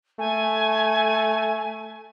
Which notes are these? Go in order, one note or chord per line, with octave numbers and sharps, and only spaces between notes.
A3 G#5